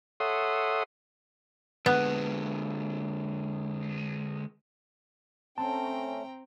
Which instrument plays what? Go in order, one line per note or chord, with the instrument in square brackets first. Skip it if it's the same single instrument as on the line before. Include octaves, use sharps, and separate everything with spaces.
[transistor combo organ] A4 C#5 E5 F#5 C6 D#6
[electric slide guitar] D3 G#3 [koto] B3
[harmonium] A3 C#4 [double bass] C4 [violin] G5 A#5 [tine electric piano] A5